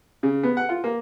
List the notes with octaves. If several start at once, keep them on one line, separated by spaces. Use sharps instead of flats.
C#3
B3
F#5
F4
A#3